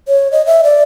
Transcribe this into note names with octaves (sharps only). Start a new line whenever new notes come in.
C#5
D#5
E5
D5